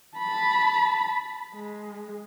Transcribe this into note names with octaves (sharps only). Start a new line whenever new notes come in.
A5 B5
G#3